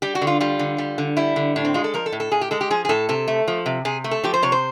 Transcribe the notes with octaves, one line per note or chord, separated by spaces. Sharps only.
G3 G4
F#4
D3
F4
G3 F4
D3
G3
D3
G3 E4
D3
A2 D4
C4
G#3 F4
A4
F3 A#4
A4
A2
A4
A2 G#4
G4
G#3 A4
G4
F3 G#4
G#4
A2 A4
C3 A4
A3
F3
C3
C3 G#4
A3
A4
F3 G4
C5
C3 C#5
C5